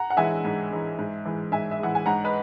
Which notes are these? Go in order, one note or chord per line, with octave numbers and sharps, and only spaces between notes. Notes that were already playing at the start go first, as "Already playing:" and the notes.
Already playing: F#5 A#5
F#5
E3 G#3 E5 G#5
G#2
E3 G#3
G#2
E3 G#3
G#2 E5 G#5
E5
E3 G#3 F#5
G#5
G#2 F#5 A#5
B4 D#5